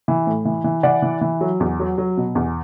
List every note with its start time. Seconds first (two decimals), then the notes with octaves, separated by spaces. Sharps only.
0.08 E3
0.27 A2
0.45 E3
0.64 E3
0.83 E3 D5 F#5
1.02 E3
1.21 E3
1.41 F#3
1.60 E2
1.80 F#3
1.98 F#3
2.17 B2
2.35 E2